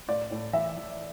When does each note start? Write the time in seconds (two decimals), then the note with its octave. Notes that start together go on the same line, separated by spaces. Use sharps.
0.08 A2 D5
0.31 A2
0.53 E3 E5
0.77 E3